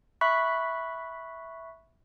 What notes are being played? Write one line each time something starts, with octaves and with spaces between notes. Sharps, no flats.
E5 B5 C#6 F#6 B6